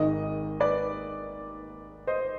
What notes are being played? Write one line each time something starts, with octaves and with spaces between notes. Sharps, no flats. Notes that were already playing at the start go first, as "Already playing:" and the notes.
Already playing: G#1 G#2 D#3 D#5
B4 D5
C5 D#5